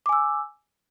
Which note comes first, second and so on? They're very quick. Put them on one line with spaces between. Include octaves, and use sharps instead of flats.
D6 G#5 E6